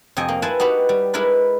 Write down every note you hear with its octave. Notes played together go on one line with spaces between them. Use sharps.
F2 C3 D#5 G5 G#5
A#3
E4 B4 C5 G#5 A5
D#4 F#4 G4 B4
G3
G#3 E4 A#4 B4 D5